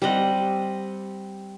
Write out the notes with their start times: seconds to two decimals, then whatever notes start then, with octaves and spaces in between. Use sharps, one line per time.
0.02 G3 C4 D#5 F#5